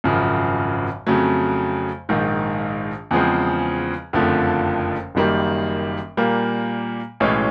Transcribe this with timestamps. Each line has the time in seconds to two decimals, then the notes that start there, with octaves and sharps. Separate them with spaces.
0.04 G#1 F#2 C#3 F3
1.07 F2 C#3 F#3 A3
2.09 A#1 G#2 D#3
3.11 E2 C#3 F3 G#3 C4
4.13 F#1 F2 D3 F3 A3
5.15 F#1 F#2 D#3 G3 A#3
6.17 A#2 G3 A#3
7.20 B1 A2 E3 G#3 C#4